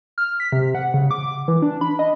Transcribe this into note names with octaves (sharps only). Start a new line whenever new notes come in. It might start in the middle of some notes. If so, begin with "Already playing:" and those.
F6
B6
C3
F#5
C#3
D6
E3
D4
B5
D#5